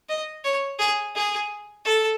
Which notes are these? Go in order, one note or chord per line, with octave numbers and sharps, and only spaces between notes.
D#5
C#5
G#4
G#4
A4